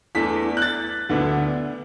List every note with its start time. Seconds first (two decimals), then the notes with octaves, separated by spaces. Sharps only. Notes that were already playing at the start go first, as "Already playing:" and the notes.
0.15 E2 E3 A3 D4 B6
0.57 F#6
0.62 A6
1.09 D2 D3 B3 D4